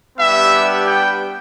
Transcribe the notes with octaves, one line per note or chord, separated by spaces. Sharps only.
G3 B3 D4 G4 E5
G5